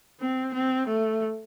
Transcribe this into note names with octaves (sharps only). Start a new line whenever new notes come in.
C4
C4
A3